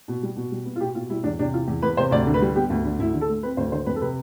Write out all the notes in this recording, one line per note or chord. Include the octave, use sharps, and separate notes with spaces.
B2
G3
B2
G3
B3
F4
B2 G4
B2 F4
G3 E4
E2 D4
C3 D4
E3 F4
E2
E2 B4
C3 C5
D2 D5
D3
B4
G3
B3 G4
D2
D3
D2 E4
D3
A4
A3
C4 B4
D2 C5
D3 C5
F2 B4
A4
C3 B4